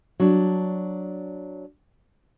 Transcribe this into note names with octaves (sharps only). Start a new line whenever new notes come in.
F#3 D4